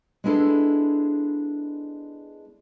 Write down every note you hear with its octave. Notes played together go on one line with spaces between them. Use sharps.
G#3 B3 D4 E4 G#4 A4